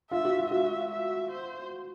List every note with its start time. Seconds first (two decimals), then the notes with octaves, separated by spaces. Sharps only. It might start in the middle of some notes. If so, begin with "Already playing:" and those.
0.11 F4 E5
0.25 F#4
0.38 F4
0.51 F#4 E5
0.91 E5
1.31 C5